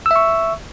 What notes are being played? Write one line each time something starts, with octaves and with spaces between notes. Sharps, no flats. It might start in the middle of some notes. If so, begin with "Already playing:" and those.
E5 C#6 E6